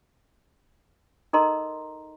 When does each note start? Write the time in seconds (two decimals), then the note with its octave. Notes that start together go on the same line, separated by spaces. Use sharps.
1.33 D#4 A4 A#4 D#5 A#5 C6